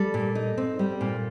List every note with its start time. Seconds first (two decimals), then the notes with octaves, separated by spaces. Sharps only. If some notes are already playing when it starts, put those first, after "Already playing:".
Already playing: G3 A4
0.14 A#2
0.35 D#4
0.57 C4
0.79 G3
1.01 A#2